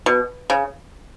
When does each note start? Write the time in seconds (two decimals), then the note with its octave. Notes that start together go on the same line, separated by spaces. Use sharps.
0.06 B2
0.50 C#3